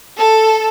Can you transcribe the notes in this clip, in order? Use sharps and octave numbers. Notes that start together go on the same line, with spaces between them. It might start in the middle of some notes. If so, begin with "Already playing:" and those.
A4